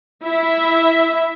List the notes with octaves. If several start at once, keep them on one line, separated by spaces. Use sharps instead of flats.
E4 E5